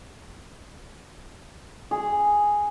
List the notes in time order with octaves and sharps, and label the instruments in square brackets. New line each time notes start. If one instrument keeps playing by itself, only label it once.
[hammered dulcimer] G#4